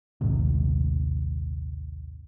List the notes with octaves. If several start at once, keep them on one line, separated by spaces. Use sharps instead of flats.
A#1 D#2 G#2 C3